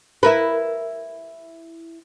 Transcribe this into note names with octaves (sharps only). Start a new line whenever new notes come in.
E4 A#4 B4